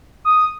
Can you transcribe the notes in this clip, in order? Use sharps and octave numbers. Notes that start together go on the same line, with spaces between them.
D#6